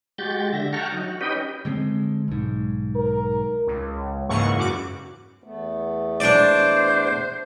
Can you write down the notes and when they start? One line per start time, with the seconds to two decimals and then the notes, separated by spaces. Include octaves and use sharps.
0.18 G#3 F#4 G4 G6 A6
0.53 D3 E5 A#6
0.73 F#5 G5 A5 A#5 C#6 F6
0.92 F#3 D#4
1.04 F#4
1.21 C#4 D#4 G4 B4 D#5 G5
1.65 D3 G#3 C4
2.28 B1 G#2
2.95 A#4
3.67 C#2
4.29 G#2 C#3 E3 A#3 F#5 C#6
4.56 F#2 F#4 D6
5.44 E2 A3 B3
6.20 D4 C5 D5